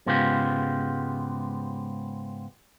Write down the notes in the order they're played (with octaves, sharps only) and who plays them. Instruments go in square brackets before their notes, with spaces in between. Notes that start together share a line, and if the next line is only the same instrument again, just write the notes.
[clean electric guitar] G#2 C#3 G#3 B3 F4 G4